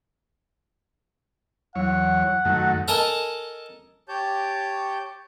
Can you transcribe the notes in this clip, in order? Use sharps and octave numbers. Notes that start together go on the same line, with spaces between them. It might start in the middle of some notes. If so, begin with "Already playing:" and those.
E2 F#3 C#5 F#5
F#2 D#3 F#3 A3
A4 A#4 D#5 G#5 A5
G4 C#5 A5 G6